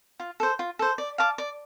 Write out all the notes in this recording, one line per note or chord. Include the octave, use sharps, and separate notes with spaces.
F4
A4 C5
F4
A4 C5
D5
F5 A5 D6
D5